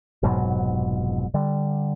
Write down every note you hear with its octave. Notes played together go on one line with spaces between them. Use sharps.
F1 G#2 B2 F#3
D3 G3